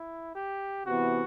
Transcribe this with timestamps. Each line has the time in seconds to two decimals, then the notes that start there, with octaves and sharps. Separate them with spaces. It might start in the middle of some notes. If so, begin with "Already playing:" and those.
Already playing: E4
0.35 G4
0.86 C3 E3 B3 E4 F#4